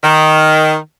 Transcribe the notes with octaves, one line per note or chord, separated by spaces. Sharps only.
D#3